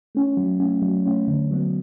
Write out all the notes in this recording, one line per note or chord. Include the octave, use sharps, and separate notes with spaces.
A3 C#4
F#3
A3 C#4
F#3
A3 C#4
D3
F#3 B3